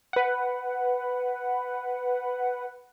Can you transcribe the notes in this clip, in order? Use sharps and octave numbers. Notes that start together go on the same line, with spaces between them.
B4 F#5